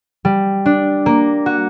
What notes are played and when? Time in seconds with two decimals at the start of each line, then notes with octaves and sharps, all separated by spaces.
0.25 G3
0.66 D4
1.06 A#3
1.46 F#4